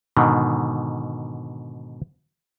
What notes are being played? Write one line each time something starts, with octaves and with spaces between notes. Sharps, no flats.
G#2 B2 D3 D#3